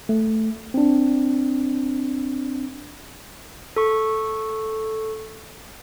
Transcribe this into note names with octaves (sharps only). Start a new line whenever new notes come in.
A3
C4 D4
A4 C#6